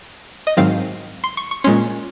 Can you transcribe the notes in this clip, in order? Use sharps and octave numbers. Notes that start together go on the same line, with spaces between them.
D#5
G#2 D#3 F#3 C4 F5
C6
C#6
C#6
A#2 G#3 C#4 C6